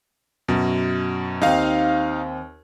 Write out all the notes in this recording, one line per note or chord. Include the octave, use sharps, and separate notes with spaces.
F#2 B2
D#2 C4 D#4 F5